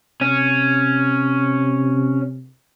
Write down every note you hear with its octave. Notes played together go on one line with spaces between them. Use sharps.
C3 C#4